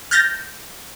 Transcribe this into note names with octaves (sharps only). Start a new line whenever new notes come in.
F6 G6 A6 A#6